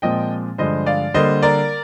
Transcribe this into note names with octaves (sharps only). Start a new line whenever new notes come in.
A#2 F3 G#3 C4 D#5 G5
G2 D3 F3 G#3 C5 D#5
D5 F5
D3 G3 A#3 C5 D#5
A#4 D5